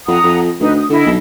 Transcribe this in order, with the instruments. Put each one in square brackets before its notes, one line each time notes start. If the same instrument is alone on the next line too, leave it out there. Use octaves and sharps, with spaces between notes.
[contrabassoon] F2 [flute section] F#5 A#5 D#6
[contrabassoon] F2
[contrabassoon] D2 [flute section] D#4 B4
[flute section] D#6
[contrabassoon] D3 [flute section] E4 D#5
[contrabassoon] B1